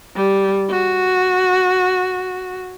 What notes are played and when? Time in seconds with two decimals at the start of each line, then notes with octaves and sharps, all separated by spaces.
0.16 G3
0.70 F#4